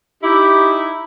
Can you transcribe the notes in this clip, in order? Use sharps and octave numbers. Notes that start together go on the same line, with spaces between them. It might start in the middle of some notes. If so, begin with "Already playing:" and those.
D#4 E4 G4